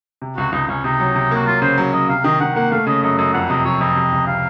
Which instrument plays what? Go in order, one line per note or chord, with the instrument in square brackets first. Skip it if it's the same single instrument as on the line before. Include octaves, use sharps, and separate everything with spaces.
[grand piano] C3
[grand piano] C#2 [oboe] F#4
[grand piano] C#2 [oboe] D#4
[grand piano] C#2 [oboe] C#4
[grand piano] C3 [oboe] D#4
[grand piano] F#3
C3
[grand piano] A#3 [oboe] F#4
[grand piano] F#3 [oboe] F4
[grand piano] C#3 [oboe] C5
[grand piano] F#3
[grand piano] F#3 [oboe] D#5
[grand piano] C3 [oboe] F5
[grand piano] D#3 [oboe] D#5
[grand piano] D#3 [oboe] F#5
[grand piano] A#3 [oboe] F#5
[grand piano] A3 [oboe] F5
[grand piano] C#3 [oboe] D#5
[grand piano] F#2 [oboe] D#5
[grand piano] F#2 [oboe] D#5
[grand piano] F2 [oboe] F#5
[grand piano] C3 [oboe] D#5
[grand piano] F3 [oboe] C#5
[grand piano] F2 [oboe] D#5
[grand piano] C3
C#2
[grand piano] C3 [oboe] F5